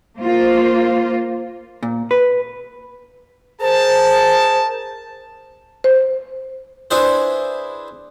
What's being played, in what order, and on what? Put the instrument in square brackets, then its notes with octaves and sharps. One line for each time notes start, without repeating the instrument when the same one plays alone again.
[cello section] A#3 F4 C5
[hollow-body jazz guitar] A#2
B4
[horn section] G#4 A#4 A5 [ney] C5
[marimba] C5
[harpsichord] D4 E4 G#4 B4 C5